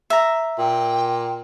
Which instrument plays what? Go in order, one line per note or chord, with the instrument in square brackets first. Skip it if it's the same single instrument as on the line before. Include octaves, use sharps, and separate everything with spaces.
[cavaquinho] E5 A#5
[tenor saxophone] A#2 [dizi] G5